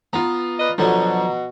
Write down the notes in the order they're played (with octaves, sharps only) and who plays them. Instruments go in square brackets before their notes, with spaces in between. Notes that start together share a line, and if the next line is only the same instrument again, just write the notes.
[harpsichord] B3 [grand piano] F4 A#5
[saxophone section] B4 D5 D#5
[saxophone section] B2 F#4 [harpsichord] D3 F#3 [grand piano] F3 [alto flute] A#5